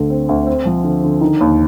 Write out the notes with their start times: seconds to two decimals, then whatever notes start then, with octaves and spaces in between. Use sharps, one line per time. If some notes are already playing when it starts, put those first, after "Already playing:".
Already playing: D2 D3
0.10 C4
0.29 D2
0.47 C4
0.65 F3
0.84 D3
1.04 D3
1.21 D#3
1.41 D#2